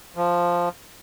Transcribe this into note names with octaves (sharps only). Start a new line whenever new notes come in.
F3